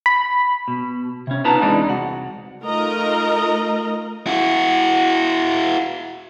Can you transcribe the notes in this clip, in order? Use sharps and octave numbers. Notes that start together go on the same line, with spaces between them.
B5
B2
C3 C#4
B3 D#4 F4 B4 A5 A#5
E2 E3 G#3 C4 D4 D#4
C2 F#4
A3 D#4 F4 A#4 D#5 A#5
E4 F#4